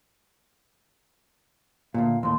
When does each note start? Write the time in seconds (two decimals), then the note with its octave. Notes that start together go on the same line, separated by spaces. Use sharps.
1.94 D2 A#2 F5
2.23 D#2 A2 C6